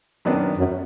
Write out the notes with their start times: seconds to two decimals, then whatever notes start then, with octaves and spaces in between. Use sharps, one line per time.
0.25 F#2 D#3 F#3 B3 D4
0.57 F#2